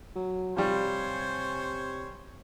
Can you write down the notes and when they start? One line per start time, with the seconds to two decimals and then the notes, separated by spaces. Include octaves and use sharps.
0.16 F#3
0.57 C3 F3 G3 C5 C#5 G#5